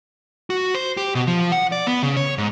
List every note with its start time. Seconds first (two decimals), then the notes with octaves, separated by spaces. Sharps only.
0.50 F#4
0.75 C5
0.97 G4
1.15 B2
1.27 F3
1.52 F#5
1.72 D5
1.87 B3
2.03 C#3
2.17 C#5
2.38 G#2